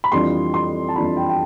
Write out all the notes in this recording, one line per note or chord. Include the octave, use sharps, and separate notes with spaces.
B5
F2 E3 G3 D4 F4 C6
C6
A5
F2 E3 G3 D4 F4 B5
G5
G5